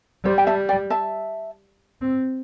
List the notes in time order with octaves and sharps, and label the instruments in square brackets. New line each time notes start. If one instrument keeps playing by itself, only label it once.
[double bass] G3 [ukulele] C5
[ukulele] G5
E5 A5
D5 G5
E5 A5
[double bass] C4